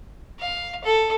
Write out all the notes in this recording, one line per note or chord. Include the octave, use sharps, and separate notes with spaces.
F5
A4